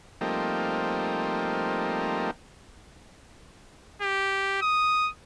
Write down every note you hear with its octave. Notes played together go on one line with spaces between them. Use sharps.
F3 G3 A3 A#3 C4 D#4
G4
D#6